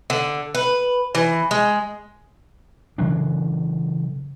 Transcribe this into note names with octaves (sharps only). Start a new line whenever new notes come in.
D3
B4
E3
G#3
C#3 E3 F#3 D4